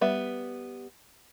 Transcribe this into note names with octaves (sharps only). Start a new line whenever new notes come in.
G3 B3 E5